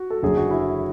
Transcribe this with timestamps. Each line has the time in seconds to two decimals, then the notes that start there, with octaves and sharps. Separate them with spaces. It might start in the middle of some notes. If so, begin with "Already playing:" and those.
Already playing: F#4
0.10 A4
0.22 F#1 F#2 D3 F#3 G#4
0.37 F#4
0.50 E4